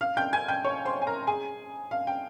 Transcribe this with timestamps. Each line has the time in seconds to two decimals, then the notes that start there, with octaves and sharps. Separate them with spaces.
0.01 F5 F6
0.17 G5 G6
0.33 G#5 G#6
0.48 G5 G6
0.65 C#5 C#6
0.85 C5 C6
1.02 G#5
1.07 A#4 A#5
1.27 G#4 G#5
1.91 F5
2.07 G5